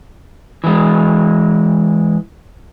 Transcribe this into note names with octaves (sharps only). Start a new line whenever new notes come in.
E3 G#3